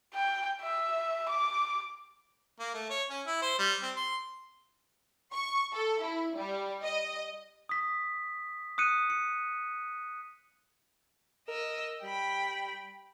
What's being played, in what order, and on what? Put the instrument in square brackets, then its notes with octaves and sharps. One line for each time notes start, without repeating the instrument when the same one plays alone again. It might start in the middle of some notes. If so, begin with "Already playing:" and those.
[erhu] G5
E5
D6
[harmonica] A#3
A3
C#5
C#4
E4
C5
G3
C4
C6
[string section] C#6
A4
E4
G3
D#5
[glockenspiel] D#6 B6
D#6 F#6 C#7 D#7
C#7
[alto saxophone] A#4 [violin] D#5 E6
[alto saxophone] G3 [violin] G5 B5